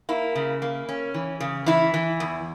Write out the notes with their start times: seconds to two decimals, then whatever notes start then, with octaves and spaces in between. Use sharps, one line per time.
0.09 A#3 E4
0.36 C#3
0.62 A#3
0.89 C#4
1.14 E3
1.40 C#3
1.66 E3 E4
1.94 E3
2.20 E2